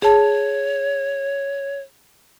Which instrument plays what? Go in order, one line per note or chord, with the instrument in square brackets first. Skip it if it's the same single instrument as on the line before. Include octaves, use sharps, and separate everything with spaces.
[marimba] G#4 A5 [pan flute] C#5